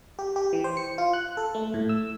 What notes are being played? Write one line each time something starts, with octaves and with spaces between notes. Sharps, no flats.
G4
G4
E3
C5
C#7
F4
F#6
A4
A3
A2
E6